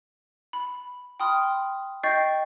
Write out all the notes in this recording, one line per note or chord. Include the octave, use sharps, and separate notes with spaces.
B5
G5 B5 C6 D#6 F6
D#5 G5 C#6 G6 A6 C7